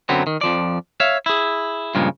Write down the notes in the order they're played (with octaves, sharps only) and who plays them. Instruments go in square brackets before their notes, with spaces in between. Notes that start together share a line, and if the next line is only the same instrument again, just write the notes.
[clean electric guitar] F#2 D3 F#3 B3 C4
D#3
F2 F3 D5
C#5 E5 F5
E4 G#4
G2 A#2 C#3 F3 G#3